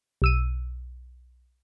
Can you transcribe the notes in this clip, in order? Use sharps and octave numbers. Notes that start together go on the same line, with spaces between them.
B1 E6 D#7